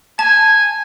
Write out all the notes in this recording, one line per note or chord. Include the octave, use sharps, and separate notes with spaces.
G#5 A5